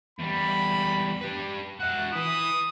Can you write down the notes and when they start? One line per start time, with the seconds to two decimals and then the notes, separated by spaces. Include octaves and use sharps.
0.19 E2 G3 B5
1.21 G4 B4
1.80 F#4 E5 F#6
2.12 E4 B4 D#6